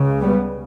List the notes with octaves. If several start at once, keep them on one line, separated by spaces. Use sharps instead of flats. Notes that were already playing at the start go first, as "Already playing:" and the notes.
Already playing: C#2 C#3
G3 B3